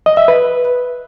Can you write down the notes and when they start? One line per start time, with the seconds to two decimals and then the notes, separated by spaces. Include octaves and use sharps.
0.06 D#5
0.17 E5
0.28 B4